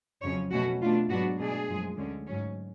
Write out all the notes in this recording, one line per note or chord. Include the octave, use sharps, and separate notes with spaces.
F2 C#3 F#3 C#4 C#5
B2 A3 C#4 F#4
B2 A3 D4 F4
G#2 F#3 B3 D4 F#4
B2 A3 D4 G#4
F#2 F3 G#3
D2 D3 G#3 C#4
G#2 F#3 C#4